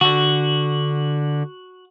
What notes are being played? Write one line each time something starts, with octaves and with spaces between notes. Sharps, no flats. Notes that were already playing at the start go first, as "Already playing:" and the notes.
D3 F#4